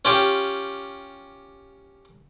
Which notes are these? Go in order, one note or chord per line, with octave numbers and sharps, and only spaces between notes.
C#4 F4 G4